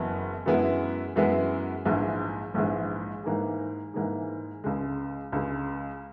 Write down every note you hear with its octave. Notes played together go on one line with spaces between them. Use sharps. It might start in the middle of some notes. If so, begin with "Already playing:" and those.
Already playing: F#1 F#2 E3 B3 E4
F#2 E3 G#3 B3 E4
F#2 E3 G#3 B3 E4
A#1 G#2 E3 G#3
A#1 G#2 E3 G#3
G#2 E3 A#3 D#4 G#4
G#2 E3 A#3 D#4 G#4
C#2 C#3 G#3
C#2 C#3 G#3